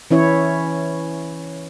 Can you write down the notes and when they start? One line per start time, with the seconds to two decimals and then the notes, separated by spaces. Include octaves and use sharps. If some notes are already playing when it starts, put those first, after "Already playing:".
0.11 E3 C#4 E4 C#5